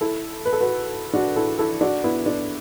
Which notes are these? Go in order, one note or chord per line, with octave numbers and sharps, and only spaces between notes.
E4 A4
B4
A4
F#4 B4
D4 F#4
E4 A4
E4 A4
D4 F#4
B3 E4
D4